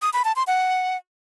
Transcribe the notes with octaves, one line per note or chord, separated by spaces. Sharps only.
D#6
B5
A5
C6
F#5